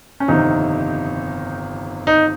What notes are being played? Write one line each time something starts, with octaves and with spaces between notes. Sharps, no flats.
C#4
G1 F2 C3 D#3 D#4
D#4